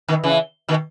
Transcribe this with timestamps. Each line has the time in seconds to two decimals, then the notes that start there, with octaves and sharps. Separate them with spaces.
0.09 B2 D#3
0.24 C#3 E3
0.68 B2 D#3